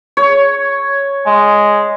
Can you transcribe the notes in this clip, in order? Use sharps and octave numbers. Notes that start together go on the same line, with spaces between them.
C#5
G#3